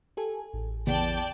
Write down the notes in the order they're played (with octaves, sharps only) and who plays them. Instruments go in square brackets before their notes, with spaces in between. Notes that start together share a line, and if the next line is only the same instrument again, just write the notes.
[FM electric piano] G4 A4 G#5
A1
[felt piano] E2 [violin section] D5 G5 A5